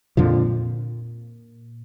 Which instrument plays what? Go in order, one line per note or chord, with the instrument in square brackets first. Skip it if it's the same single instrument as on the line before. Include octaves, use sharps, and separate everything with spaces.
[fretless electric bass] F2 D3 F3 [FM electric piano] A#2